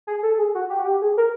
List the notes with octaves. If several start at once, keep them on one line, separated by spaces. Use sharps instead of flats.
G#4
A4
G#4
F#4
G4
F#4
G4
G#4
A#4